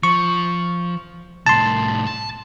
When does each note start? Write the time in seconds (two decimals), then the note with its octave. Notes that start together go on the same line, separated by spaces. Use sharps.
0.03 F3 C#6
1.46 C2 A2 A5 C6
2.07 A5